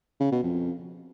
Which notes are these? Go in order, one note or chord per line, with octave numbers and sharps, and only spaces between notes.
C#3
B2
F2